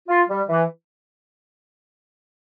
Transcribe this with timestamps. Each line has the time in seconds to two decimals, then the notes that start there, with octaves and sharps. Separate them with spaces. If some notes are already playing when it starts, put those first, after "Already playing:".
0.08 F4
0.29 G3
0.49 E3